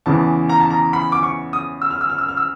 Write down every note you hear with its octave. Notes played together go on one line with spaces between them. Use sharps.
E2 C#3 E3 A5
A#5
A5
A#5
B5
D6
C#6
D#6
E6
F6
E6
F6
E6
F6
E6